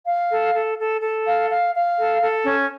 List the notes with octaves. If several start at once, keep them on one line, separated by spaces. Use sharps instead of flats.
F5
A4
A4
A4
A4
F5
F5
F5
A4
A4
C#4